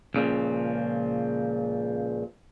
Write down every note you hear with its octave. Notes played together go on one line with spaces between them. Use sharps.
C#2 A#2 C#3 F3